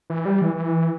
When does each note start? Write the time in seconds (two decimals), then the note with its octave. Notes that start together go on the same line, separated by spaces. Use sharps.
0.10 E3
0.25 G3
0.42 E3
0.57 E3